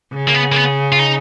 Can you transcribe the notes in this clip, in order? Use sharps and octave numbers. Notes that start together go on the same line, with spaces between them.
C#3
A#3
B3
A#3
B3
F4
D#4